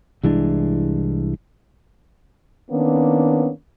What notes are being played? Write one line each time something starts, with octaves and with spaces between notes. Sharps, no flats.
C2 E3 G#3 D4
D#3 A#3 B3 C#4 D4